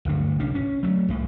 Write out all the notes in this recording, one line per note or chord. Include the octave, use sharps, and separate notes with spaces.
D1 G1 G2 A3
B1 C#3 C#4 D4
C#4
F#3 A3
C2 A2